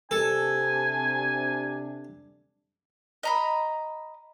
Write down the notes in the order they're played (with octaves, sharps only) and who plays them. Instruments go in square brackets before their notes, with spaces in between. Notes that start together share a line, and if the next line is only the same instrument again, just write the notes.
[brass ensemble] C3 D4 [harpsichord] A4 [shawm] G#5
[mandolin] D#5 A#5 B5